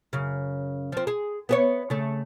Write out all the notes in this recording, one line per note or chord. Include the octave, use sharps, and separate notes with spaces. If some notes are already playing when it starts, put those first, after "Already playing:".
F#2 C#3
F3 C4
G#4
B3 G#4 C#5
C#3 A3